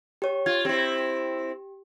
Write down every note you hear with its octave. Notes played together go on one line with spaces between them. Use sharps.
G4 C#5
F4 G#6
C4 E4 G4